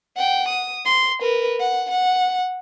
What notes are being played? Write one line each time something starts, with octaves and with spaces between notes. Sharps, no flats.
F#5 G5
D#6
C6
A#4 B4
F#5
F#5